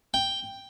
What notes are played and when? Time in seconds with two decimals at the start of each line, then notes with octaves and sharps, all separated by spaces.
0.14 G5